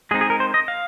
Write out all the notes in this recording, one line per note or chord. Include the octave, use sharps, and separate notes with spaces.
G#3 C4 D#4 G#4
G#4
A#4
C5
D#5
F5